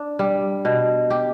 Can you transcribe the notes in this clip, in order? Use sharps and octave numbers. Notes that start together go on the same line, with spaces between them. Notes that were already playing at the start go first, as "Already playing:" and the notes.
Already playing: D4
G3
B2
G4